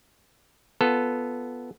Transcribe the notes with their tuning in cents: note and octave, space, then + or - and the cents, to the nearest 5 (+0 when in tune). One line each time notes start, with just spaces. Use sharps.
B3 +0 F4 +0 A4 +0